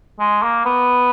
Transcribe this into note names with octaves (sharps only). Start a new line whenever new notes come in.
G#3
A#3
B3